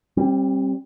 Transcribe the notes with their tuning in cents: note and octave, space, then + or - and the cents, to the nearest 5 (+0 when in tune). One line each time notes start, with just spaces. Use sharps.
G3 +0 C4 +35